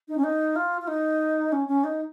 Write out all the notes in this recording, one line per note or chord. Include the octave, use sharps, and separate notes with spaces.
D#4
C#4
D#4
F4
F4
D#4
C#4
C#4
D#4